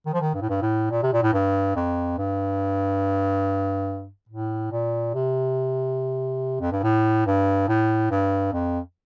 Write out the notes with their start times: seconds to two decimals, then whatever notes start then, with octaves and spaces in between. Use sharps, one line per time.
0.06 D#3
0.14 F3
0.21 D#3
0.34 G2
0.41 A2
0.50 G2
0.62 A2
0.91 A#2
1.03 C3
1.13 A#2
1.22 A2
1.33 G2
1.76 F2
2.18 G2
4.29 A2
4.72 A#2
5.14 C3
6.60 F2
6.72 G2
6.83 A2
7.26 G2
7.68 A2
8.11 G2
8.53 F2